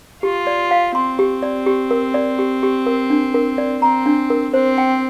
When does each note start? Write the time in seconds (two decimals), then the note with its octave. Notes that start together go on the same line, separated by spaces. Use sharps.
0.22 F4 G4
0.47 D5
0.71 F5
0.95 C4 C6
1.19 G4
1.43 D5
1.66 G4
1.91 A#4
2.14 D5
2.39 G4
2.63 G4
2.86 A#4
3.10 D4
3.34 A#4
3.58 D5
3.82 C4 A#5
4.06 D4
4.30 A#4
4.54 C4 C5
4.78 G5